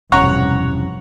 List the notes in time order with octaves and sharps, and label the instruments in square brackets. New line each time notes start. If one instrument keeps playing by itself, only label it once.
[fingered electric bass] E1 C#4 [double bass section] G2 C3 F3 [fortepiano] C#5 F#5 A#5